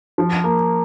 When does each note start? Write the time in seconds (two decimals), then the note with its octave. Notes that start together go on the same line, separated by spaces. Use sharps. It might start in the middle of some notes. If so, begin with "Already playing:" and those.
0.18 F3
0.44 A#3